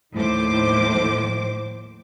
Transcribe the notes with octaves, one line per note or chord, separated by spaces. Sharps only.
D#2 A2 D#3 F3 C5 D6